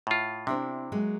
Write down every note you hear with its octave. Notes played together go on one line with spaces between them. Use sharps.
A2 F4
C3 C4 D4 E4
F#3 G#3 A#3